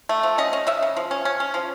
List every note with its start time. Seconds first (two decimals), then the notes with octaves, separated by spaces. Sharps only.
0.09 A3
0.23 F3
0.38 C#4 D#5
0.53 C#4
0.67 C#3 E5
0.82 C#3
0.97 F3
1.11 C#4
1.25 C#4
1.40 C#4
1.54 F3